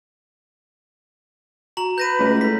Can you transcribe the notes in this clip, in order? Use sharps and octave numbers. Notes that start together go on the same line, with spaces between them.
F#4 A#5 F#7
B4 G6 A#6 D#7
C#2 G#3 A3 F4
E4 A4 B6